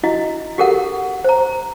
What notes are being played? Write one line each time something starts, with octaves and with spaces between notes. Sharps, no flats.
E4 F#4 D#5
F#4 G4 A4 A#4 F#5
C5 A#5